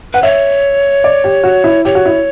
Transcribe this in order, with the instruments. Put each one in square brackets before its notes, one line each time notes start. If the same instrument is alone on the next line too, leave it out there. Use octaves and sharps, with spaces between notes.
[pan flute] B4 [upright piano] F#5
[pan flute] C#5 [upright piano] E5
[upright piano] D5
G4
F#4
E4
[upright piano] G4 [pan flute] C#5
[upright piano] F#4
E4